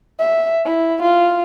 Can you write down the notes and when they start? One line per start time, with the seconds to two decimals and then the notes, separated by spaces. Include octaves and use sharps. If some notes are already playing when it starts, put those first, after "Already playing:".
0.19 E5
0.65 E4
1.02 F4